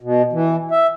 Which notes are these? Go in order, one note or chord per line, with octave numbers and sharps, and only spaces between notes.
B2
E3
E5